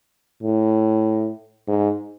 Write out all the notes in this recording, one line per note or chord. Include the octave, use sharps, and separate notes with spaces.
A2
G#2